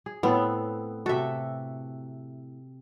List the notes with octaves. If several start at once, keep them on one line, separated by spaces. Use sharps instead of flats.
G#4
A2 B3 C4 A4
C3 F#4 A4 E5